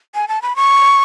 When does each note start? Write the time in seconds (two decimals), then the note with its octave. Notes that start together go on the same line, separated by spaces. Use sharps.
0.15 G#5
0.28 A5
0.42 B5
0.56 C#6